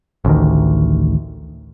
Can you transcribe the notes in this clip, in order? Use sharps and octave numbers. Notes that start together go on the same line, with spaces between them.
A1 D2 D#3